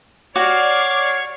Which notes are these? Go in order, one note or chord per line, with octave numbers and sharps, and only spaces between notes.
F#4 C#5 D5 D6 F6 C7